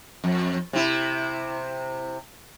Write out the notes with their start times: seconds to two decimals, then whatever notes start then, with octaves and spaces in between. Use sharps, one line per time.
0.24 F2
0.73 C3 E4